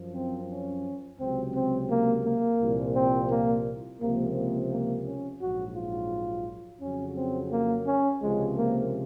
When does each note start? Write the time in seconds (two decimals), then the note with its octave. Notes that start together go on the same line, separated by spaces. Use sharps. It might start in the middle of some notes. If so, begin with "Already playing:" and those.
Already playing: F#2 F3
0.14 C4
0.50 C#4
1.20 C#2 C3 F#3 C4
1.55 C4
1.91 A#3
2.25 A#3
2.61 C2 A#2 F3
2.95 C4
3.31 A#3
4.00 C#2 C3 F3 A#3
4.36 A#3
4.72 A#3
5.06 C#4
5.42 A#1 G#2 F#3 F#4
5.76 F4
6.81 F2 C#3 F#3 C#4
7.17 C4
7.52 A#3
7.87 C#4
8.22 C#2 C3 F3 G#3
8.58 A#3